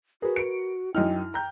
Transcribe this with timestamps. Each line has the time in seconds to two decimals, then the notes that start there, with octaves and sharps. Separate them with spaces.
0.22 F#4 G#4 A#4 B4
0.36 C#7 D7
0.95 F#2 D#4 E4 G5 F6
1.34 G5 A#5 G6